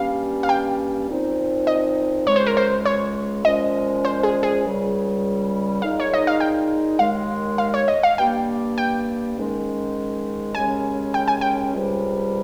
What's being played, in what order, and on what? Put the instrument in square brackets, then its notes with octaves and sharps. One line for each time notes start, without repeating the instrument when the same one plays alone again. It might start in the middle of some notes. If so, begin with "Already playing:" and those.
Already playing: [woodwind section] G2 G3 A#3 C#4 [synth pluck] F5
[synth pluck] F5
G5
[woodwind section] A#2 F3 C4 D#4
[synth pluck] D#5
[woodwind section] C#2 C#3 G#3 [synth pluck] C#5
[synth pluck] C5
A#4
C5
C#5
[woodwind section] A#2 F3 G#3 C#4 [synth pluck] D#5
[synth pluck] C5
G#4
G#4
[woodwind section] C#2 C#3 G3
[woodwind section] A#2 G#3 D#4 [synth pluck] F5
[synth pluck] C#5
D#5
F5
G5
[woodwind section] D#2 D#3 G#3 [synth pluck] F5
[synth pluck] F5
C#5
D#5
F5
[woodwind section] G2 G3 A#3 [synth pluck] G5
[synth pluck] G5
[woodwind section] G#2 D#3 G#3 C#4
[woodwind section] D#2 C#3 G#3 C#4 [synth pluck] G#5
[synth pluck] G5
G#5
G5
[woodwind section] C#2 C3 G3